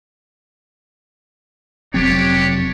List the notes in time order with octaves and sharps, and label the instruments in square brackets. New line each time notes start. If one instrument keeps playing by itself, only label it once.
[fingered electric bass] F1 F#3 C4 [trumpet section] D4 G4 C#5